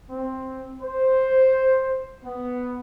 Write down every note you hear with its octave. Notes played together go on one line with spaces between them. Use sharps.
C4
C5
B3